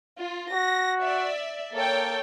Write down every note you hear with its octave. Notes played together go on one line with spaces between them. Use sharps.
F4
F#4 A#6
D5 E5
A#3 A4 C#5 G5